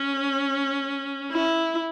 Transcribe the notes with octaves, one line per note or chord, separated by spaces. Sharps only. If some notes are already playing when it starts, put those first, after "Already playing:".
Already playing: C#4
E4